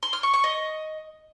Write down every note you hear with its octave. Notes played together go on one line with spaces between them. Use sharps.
C6
F6
C#6
C#6
D#5